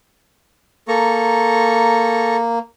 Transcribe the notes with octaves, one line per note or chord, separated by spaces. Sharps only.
A#3 A4 A#5 C#6